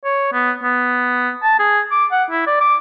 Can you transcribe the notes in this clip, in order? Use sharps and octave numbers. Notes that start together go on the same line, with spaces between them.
C#5
B3
B3
A5
G#4
D6
F#5
E4
D5
D6